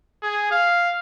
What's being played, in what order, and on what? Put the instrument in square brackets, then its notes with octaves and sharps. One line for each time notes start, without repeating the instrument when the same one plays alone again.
[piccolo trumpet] G#4
F5